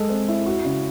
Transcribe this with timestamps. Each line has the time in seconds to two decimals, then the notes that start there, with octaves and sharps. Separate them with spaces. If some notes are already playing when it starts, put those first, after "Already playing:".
Already playing: G#3 A4
0.09 C4
0.28 E4
0.46 F#4
0.65 C#3